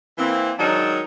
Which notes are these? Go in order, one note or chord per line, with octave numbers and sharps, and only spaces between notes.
E3 A#3 C4
D#3 F#3 G#3 D4 D#4 C#5